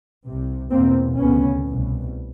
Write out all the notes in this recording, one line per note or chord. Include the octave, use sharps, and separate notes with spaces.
C2 C3
E2 B2 A#3 C4
D2 C#3 B3 C#4
C2 B2